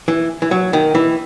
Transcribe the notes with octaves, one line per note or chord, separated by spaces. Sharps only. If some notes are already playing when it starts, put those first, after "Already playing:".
E3
E3
F#3
D#3
E3